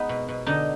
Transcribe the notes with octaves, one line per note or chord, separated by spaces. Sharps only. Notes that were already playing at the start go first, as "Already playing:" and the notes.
Already playing: G#3 B3 D#4
B2
B2
D3 D#4